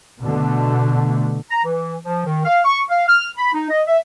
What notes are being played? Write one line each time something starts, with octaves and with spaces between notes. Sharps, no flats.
B2 D3 A3
A#5
E3
F3
D#3
F5
C#6
F5
F6
B5
D#4
D#5
E5